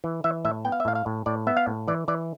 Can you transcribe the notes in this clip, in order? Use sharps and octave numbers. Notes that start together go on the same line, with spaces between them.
E3
E3 E5
A2 E5
B3 G5
F5
E5
A2 F5
F5
A2
A2 D5
B3 E5
F5
A2
E3 D5
E3 D5